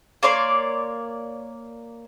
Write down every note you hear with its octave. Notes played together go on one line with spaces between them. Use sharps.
A#3 C#5 D5 C6